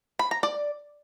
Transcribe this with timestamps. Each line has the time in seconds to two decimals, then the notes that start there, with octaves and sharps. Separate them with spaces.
0.19 B5
0.31 A#5
0.43 D5